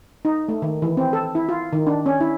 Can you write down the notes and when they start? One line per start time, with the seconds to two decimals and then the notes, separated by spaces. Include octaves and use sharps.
0.25 D#4
0.49 A3
0.62 D#3
0.82 E3
0.97 C4
1.13 A4
1.35 E4
1.49 F4
1.73 D#3
1.87 D4
2.06 C#4
2.21 E4